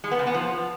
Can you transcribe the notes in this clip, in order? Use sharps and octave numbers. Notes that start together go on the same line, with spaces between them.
G#3
B3
C#3
B3
F3